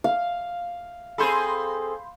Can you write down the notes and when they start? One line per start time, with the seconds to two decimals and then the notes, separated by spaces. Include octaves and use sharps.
0.04 F5
1.18 C4 G#4 A4 B5 C6 G6